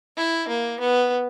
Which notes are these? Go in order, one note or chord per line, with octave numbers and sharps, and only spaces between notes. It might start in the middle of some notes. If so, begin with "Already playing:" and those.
E4
A#3
B3